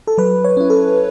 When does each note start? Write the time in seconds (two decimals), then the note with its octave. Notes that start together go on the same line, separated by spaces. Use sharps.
0.07 A4
0.18 F#3 B4
0.44 C#5
0.57 C#4 E4
0.70 A4